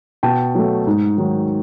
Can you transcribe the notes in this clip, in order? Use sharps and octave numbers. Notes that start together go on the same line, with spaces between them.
B2 G5 A5
F#3 A3
G#2
D#3 F#3